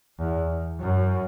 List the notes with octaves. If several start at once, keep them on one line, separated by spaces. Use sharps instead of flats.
E2
F#2